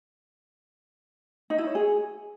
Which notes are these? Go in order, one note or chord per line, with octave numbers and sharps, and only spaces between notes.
D#4
E4
C#5
G#4